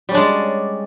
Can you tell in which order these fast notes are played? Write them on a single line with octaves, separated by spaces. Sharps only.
G3 C#4 D4 G#3